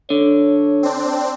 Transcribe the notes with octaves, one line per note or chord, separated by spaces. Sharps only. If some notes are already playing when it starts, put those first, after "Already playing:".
D3 C#5
C4 D4